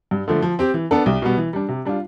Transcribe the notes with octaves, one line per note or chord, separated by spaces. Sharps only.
G2
D3 F3 A3
F3
C4 G4
E3
B3 D4 A4
C2
B2 G3 B3
E3
G3 D4
C3
G3 D4 F4